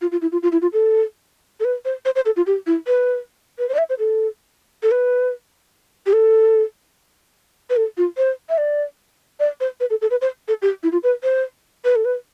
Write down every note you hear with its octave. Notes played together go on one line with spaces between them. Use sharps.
F4
F4
E4
F4
F4
E4
F4
A4
A4
B4
C5
C5
C5
A4
F4
G4
E4
B4
B4
C5
D5
E5
C5
A4
A4
B4
G4
A4
B4
A4
F4
C5
E5
D5
D5
C5
B4
A4
A4
B4
C5
A4
G4
E4
F4
B4
C5
B4
A4
B4